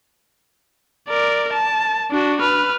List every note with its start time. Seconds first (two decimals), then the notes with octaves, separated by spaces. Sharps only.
1.08 A#4 D5
1.53 A5
2.11 D4 F#4
2.41 B4 F6